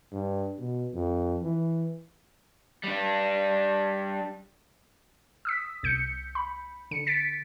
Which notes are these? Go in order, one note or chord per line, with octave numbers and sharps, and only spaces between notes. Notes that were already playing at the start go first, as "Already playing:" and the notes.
G2
B2
F2
E3
G3 D4
D#6 E6 B6
C2 G6 C#7
B5
D3 C#7
A6 B6 D7